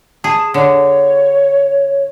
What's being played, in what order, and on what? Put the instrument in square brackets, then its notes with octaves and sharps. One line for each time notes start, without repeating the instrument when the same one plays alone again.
[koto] G#4 [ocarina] A5
[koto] D3 [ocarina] C#5